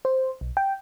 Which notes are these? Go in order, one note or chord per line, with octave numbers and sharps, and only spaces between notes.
C5
B1
G5